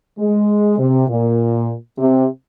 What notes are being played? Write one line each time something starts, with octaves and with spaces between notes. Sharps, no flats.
G#3
C3
A#2
C3